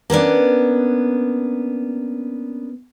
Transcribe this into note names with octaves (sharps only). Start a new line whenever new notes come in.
A#3 B3 C#4 D4